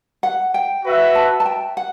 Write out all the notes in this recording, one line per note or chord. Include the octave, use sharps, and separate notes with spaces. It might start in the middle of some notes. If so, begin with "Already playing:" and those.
F#5
G5
F#4 B4 E5
A5
A5
G5
F#5